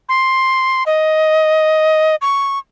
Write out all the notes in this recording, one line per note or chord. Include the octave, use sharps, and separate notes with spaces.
C6
D#5
C#6